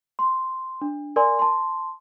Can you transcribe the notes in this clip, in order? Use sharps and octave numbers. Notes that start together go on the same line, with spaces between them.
C6
D4
A#4 D5 G#5 C6
A5 C6